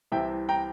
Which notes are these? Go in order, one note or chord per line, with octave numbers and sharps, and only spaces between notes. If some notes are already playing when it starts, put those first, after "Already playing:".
C2 C3 E3 E5 G5
G5 A#5